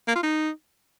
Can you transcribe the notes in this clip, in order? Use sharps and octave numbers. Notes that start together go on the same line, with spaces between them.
A#3
F4
D#4